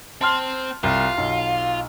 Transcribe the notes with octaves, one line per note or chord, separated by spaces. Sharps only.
C4 A5 C6 F6
C2 F4
B1